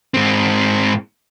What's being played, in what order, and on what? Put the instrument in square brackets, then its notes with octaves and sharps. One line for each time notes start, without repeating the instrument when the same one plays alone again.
[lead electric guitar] G#2 C4